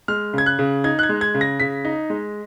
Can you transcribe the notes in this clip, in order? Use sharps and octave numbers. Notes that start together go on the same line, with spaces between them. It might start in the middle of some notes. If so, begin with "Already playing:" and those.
G#3 F6
C#3 G#6
F#6
C#3
D#4 G#6
F#6
G#6
G#3
G#6
C#3
A#6
C#3 B6
D#4
G#3